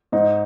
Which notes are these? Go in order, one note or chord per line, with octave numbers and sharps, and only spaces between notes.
G#2 D#4